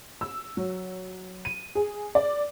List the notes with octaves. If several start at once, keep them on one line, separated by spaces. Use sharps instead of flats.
E6
F#3
D#7
G#4
D5